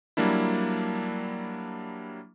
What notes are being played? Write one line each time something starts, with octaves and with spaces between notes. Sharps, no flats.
F#3 G3 A#3 D4 E4